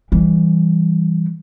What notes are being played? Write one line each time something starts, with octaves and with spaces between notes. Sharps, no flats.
E3 G3